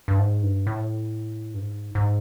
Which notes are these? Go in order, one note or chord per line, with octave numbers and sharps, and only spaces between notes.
G2
G#2
G2
A2
G2
G#2
G#2